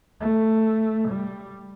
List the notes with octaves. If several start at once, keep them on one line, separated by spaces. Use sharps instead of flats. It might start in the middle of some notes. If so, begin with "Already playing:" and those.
A3
G3